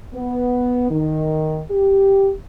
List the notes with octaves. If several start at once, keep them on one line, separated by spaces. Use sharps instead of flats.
B3
D#3
G4